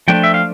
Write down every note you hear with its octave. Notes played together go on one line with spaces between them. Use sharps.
F3 A3 D4 G5
E5
F5